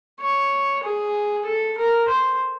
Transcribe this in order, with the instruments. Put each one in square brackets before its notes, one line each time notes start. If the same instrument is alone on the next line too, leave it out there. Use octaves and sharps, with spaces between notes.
[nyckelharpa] C#5
G#4
A4
A#4
C5